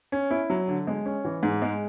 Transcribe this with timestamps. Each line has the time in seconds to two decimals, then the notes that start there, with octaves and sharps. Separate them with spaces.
0.12 C#4
0.31 E4
0.50 F#3
0.68 D3
0.87 G#3
1.06 C#4
1.25 E3
1.43 G#2
1.62 G#3